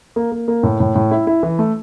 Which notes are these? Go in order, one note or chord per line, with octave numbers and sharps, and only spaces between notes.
A#3
A#3
A#3
A2
A2
A2
E4
E4
E3
A3